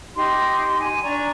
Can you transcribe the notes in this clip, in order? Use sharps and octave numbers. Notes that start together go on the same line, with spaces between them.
D#4 G4 C6
G#5
D4 D5 A#5 C#6